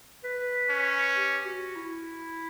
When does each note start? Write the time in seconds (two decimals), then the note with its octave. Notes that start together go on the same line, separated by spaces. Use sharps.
0.24 B4
0.70 C#4
1.16 G4
1.46 F#4
1.76 E4